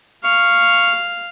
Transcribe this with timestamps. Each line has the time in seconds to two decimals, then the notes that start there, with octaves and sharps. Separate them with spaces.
0.24 F5 C#6 F6